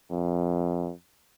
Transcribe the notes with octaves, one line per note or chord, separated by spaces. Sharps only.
F2